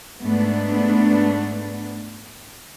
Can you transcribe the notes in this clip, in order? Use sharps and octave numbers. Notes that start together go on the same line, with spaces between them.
G#2 A3 B3 D4